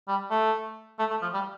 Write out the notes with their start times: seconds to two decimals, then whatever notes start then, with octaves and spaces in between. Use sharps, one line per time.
0.08 G3
0.31 A3
0.99 A3
1.11 A3
1.22 F3
1.34 G3